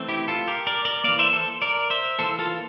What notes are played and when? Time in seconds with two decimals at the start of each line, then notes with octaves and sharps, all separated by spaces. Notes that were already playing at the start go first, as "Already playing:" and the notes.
Already playing: E3 A3 C4
0.08 E4 G4
0.28 F4 A4
0.48 G4 A#4
0.67 A#4 D5
0.85 A#4 D5
1.04 E3 A#3 D5 F5
1.19 C5 E5
1.33 A4 C5
1.62 A#4 D5
1.90 C5 E5
2.19 E3 A#3 A4 C5
2.39 F4 A4